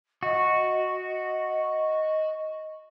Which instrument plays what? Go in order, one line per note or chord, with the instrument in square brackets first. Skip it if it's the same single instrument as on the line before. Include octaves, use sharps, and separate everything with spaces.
[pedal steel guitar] F#4 [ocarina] D#5